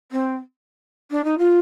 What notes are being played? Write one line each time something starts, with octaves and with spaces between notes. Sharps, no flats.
C4
D4
D#4
F4